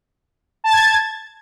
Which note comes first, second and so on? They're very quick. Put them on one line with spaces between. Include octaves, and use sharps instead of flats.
A5 A6 G#6